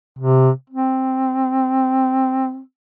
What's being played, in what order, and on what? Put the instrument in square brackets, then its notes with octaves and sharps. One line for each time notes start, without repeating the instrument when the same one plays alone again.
[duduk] C3
C4